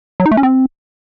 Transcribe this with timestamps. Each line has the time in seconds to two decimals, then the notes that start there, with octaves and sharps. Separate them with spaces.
0.20 F#3
0.26 D#4
0.31 A3
0.37 C#4
0.43 C4